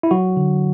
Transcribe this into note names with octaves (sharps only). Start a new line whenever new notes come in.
E4
F#3 F#4
D3